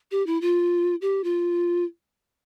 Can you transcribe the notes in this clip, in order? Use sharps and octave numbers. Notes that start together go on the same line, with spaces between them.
G4
E4
F4
G4
F4